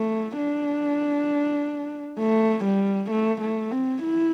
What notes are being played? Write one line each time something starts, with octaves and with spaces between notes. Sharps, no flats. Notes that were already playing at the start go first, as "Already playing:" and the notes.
Already playing: A3
D4
A3
G3
A3
A3
C4
E4